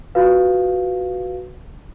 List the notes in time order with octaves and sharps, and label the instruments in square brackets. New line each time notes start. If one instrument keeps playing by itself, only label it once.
[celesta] F4 F#4 B4 F5